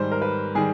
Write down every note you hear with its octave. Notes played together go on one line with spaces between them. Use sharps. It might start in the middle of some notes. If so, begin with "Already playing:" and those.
Already playing: G#2 D#3 G3 C5
A#4
B4
D#3 G3 G#4